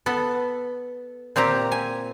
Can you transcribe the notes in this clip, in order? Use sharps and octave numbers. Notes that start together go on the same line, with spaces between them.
B3 A4
A#2 C4 G4 A#5
G#5